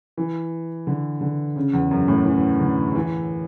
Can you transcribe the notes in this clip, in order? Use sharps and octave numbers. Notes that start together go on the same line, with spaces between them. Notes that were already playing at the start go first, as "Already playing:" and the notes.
E3
D3
D3
C#3
E2
F#2
A2
E3
D3
E3